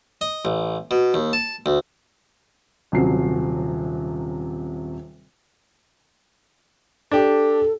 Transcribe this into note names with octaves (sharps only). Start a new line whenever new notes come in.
D#5
A1
B2
D#2
A5
D2
D#1 C3 F#3 C#4 C7
D4 G4 A4